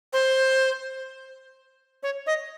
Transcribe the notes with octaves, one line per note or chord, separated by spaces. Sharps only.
C5
C#5
D#5